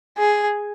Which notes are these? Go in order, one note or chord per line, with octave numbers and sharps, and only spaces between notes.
G#4